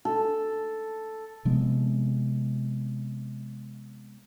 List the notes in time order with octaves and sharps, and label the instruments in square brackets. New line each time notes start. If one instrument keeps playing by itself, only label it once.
[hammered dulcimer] A4
[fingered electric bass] C3 F3 G#3 B3